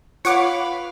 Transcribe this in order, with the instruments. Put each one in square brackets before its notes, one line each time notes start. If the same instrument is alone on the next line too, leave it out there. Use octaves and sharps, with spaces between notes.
[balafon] F4 [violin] B4 F5 [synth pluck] C#5 F#5 D6